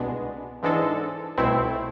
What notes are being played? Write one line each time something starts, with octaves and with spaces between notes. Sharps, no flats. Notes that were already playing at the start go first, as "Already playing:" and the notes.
Already playing: C2 B2 G#3 B3 D4
G#2 E3 G#3 D4 A4
C2 B2 A3 C4 E4